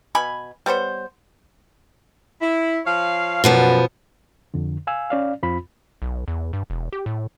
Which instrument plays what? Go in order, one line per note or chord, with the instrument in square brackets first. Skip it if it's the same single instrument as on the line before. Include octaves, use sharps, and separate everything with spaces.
[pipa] B2 G#5 B5
G3 B3 C5 C#5
[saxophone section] E4
F3 C#5 F5
[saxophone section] F#2 [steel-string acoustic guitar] B2 F3 B3
[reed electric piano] F2 D3
F5 G#5 E6
C#4 D5 F5
F2 C4 F4 B5
[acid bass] B1
E2
G2
E1
G4
A2